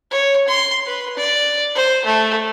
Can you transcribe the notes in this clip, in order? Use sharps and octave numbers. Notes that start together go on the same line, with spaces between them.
C#5
C6
B4
D5
C5
A3